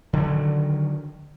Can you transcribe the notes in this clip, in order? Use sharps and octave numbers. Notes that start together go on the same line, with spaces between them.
D3 D#3 F#3